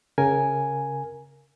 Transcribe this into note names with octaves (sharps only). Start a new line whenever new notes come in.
C#3 A#4 G#5